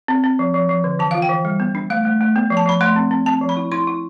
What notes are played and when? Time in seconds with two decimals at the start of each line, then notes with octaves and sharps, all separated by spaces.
0.08 C4
0.24 C4
0.39 F3
0.54 F3
0.69 F3
0.84 D3
0.99 E3 A5
1.11 F4 F5
1.22 G5
1.29 E3
1.45 G3
1.60 B3
1.75 D4
1.90 A3 F5
2.05 A3
2.21 A3
2.36 B3
2.50 F3
2.57 A5
2.66 F3 B5
2.81 A3 C6
2.96 C4
3.11 C4
3.26 C4 A5
3.41 F3
3.49 B5
3.57 E4
3.72 E4 C6
3.87 E4